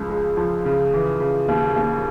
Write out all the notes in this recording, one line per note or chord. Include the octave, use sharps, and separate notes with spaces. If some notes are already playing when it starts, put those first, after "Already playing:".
Already playing: C#2 C#3 F3
G#3
F3
C#3
E3
C#3
D#2
D#2